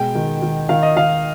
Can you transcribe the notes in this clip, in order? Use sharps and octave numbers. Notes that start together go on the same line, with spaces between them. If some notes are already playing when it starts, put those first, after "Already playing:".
Already playing: B2 G#3 G5
D#3
D#3
D#3 F5
D#5
D#3 F5